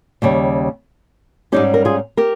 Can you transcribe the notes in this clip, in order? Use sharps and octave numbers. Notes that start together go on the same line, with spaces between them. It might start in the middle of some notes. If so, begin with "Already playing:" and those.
D#2 C#3 G3
G#2 G3 C#4 D#4 G4
A#4
F4 G#4
G4 A#4